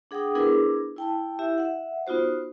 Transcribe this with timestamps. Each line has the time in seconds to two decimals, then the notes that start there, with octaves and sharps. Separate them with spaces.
0.11 D4 G#4 F#5 G5 D#6
0.35 B3 D4 E4 G#4 A#4 B4
0.96 E4 G5 A5
1.39 E4 G4 E5
1.58 E5 F#5
2.07 B3 D#4 F4 F#4 C5